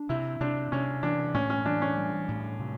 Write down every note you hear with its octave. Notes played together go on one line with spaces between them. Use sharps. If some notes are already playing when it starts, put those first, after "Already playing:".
Already playing: D4
C3 E4
C3 D4
C3 C#4
E3 D4
A2 C#4
C#4
E3 D4
C#4
G3
A2
C3